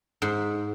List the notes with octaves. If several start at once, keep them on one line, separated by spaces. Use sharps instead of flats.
G#2